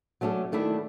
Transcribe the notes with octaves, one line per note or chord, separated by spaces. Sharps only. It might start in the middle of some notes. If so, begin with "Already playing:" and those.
F#3 A3 C#4 D4 A4
D#3 A3 D4 E4